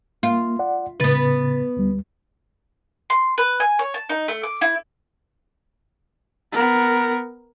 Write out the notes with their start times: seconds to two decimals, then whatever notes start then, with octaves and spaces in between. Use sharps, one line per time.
0.23 A#3 F4
0.59 D5 F#5
1.00 A2 C#3 B3 B4 A6
1.77 D2 G3
3.10 C6
3.38 B4
3.60 G#5
3.79 C#5
3.94 A5
4.09 D#4
4.28 A3
4.43 D6
4.61 E4
6.52 B3 A#4